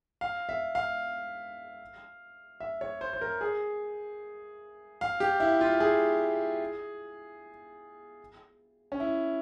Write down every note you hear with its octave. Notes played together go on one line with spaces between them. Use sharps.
F5
E5
F5
E5
C#5
C5
C5
A#4
G#4
F5
G4
E4
F4
G#4
C#4
E4